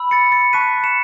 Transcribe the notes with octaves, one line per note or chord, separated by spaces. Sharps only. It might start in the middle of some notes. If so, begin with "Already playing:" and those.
Already playing: B5 E6
A6 C#7
A6 C#7
A5 C#6 F#6 B6 D#7
C#7 E7